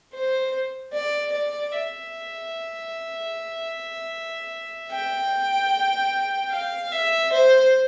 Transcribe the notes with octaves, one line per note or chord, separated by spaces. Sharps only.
C5
D5
D5
E5
G5
F5
E5
C5